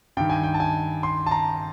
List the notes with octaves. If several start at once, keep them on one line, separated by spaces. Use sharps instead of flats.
G2 D#3 G5
G#5
G5
A5
G#5
C6
A5
A#5